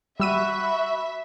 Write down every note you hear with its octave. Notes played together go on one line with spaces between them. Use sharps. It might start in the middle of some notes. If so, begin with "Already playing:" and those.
G3 F#4 E5 B5 E6 D#7